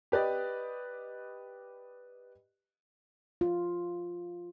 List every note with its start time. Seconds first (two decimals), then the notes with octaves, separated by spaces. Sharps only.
0.12 G4 B4 D5 D#5
3.41 F4